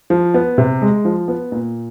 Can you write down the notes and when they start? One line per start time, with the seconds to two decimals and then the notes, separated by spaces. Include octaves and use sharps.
0.10 F3
0.34 B3
0.58 C3
0.82 G#3
1.05 F3
1.28 B3
1.52 A#2